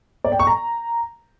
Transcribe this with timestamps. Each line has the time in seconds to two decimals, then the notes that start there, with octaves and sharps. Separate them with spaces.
0.24 D5
0.32 G5
0.39 C#6
0.47 A#5